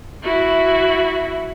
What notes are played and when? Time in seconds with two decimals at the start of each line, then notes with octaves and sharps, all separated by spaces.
0.23 E4 F#4